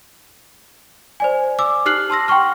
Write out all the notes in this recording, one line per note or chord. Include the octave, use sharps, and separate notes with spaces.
C5 D5 G#5
D6 E6
D#4 G4 F6 F#6 C7 F#7
A5 C6 E6 A#6
F#5 G5 C6 C#6 F6